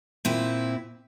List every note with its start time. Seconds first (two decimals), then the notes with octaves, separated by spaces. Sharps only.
0.25 A#2 C4 E4